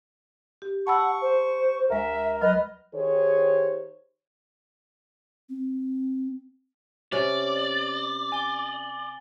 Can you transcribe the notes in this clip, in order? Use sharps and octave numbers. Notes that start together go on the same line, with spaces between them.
G4
F#5 A5 B5 C#6 E6
C5
D2 G#3 A#4 E5
F#3 B4 D#5 F6
D#3 G4 G#4 C5 C#5
C4
C3 C#4 D5
G#5 A6 G7